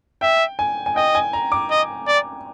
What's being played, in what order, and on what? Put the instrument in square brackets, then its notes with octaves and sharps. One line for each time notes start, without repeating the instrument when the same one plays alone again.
[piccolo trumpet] E5 [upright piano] G5
[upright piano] G#5
G#5
[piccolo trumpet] D#5 [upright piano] G5
[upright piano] G#5
A#5
D6
[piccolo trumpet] D#5
D5